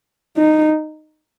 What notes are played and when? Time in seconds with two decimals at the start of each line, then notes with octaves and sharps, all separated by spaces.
0.37 D#4